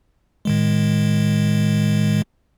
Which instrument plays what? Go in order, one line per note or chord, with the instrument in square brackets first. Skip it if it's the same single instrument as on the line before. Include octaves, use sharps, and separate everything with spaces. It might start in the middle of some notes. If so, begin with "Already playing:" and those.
[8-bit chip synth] A2 D#3 G#3